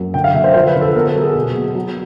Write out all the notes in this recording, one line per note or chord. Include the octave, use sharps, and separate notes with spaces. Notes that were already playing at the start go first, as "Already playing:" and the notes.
Already playing: F#2
D3 G5
F5
D3 E5
C5
F3 C5
B4
D3
A4
B3 A#4
A4
F#3
G#4
B2
B3
F#3